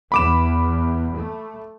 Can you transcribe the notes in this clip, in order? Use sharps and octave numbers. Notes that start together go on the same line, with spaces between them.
E2 B5 D6 E7
A3